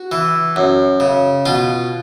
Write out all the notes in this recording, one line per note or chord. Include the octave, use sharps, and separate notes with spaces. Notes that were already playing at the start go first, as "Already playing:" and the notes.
Already playing: F#4
E3
F#2
C#3
B2 F4